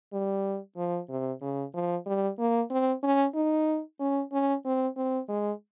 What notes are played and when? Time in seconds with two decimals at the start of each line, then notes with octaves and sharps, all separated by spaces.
0.13 G3
0.77 F3
1.09 C3
1.41 C#3
1.74 F3
2.06 G3
2.39 A#3
2.70 C4
3.03 C#4
3.35 D#4
4.00 C#4
4.32 C#4
4.65 C4
4.96 C4
5.29 G#3